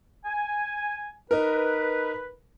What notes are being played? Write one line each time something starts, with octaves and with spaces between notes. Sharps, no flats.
G#5
D#4 A#4 B4